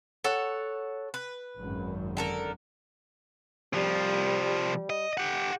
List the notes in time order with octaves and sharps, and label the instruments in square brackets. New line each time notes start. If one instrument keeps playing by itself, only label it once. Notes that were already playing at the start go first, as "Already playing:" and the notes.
[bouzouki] A4 C#5 F#5
B4
[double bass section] G#1 F#2
[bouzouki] D3 A4 A#4
[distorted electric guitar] C2 F3 [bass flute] G3
[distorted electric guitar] D#5
G4 F#5